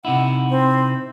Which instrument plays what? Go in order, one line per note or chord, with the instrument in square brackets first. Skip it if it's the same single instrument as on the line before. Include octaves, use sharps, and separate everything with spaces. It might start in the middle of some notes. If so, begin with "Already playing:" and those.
[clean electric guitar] C3 D#4 E4 [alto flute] F#5
[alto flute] C4